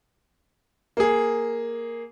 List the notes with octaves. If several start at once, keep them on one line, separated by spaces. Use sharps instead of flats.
A#3 G#4